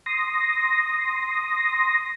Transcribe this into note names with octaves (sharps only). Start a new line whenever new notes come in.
C6 D#6 A#6